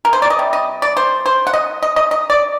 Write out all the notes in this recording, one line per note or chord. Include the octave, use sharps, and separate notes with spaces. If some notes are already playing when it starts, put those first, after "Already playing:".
A#4
C5
D5
D#5
C3 G3
D#5
D5
C5
C5
F#5
D#5
D#5
D#5
D#5
D5